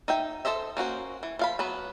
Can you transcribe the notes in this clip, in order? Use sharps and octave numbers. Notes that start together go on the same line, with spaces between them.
D#4 E5 G5
A4 C5 D#5 E5
A#3 C#4 F#4 C5
E3
F3 F5 B5
F#3 B3 B4